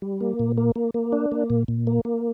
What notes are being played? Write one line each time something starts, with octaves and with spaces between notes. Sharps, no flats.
G3
A#3
A#2
A#3
A#3
A#3
D4
A#3
A#2
A#2
A#3
A#3